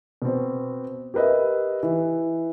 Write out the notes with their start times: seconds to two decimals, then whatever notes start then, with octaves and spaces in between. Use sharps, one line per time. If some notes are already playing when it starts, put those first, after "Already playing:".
0.22 B2 C4
1.14 G4 A#4 B4 D#5 E5
1.83 E3